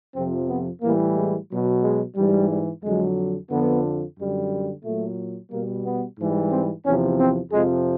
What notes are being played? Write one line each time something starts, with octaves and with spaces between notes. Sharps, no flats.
F2 C3 F3 C4
B3
A2 E3 G3 A#3
G#3
B2 F#3
G#3
G#2 E3 G3
G3
F2 D3 F#3 G#3
F2 D3 F3 B3
F#2 D3 G3
A#2 F#3 A3
B2 G3 A#3
B3
G#2 E3 G3
C4
E2 C3 F3 C#4
C4
F2 C3 F3 G#3